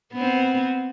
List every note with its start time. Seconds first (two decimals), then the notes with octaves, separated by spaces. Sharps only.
0.14 B3 C4